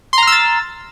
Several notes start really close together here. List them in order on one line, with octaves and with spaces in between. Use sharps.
C6 A#5 F6 E6 A6